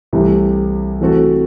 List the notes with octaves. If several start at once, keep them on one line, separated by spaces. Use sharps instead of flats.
C2 C3 E3 A3 E4
E3 A3 C4 F#4 A4